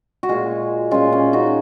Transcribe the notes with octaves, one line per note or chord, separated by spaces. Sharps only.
F#4
A#2 G#3 F4 G#4
A#2 G#3 C#4 F4
C#4
D#4 F#4